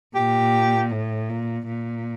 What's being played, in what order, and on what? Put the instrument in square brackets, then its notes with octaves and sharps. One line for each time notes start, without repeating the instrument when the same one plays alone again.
[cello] A#2 [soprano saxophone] G4
[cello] A2
A#2
A#2